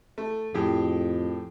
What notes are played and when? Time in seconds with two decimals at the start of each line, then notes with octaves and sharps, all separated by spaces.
0.18 A3
0.54 F2 A2 G4 G#4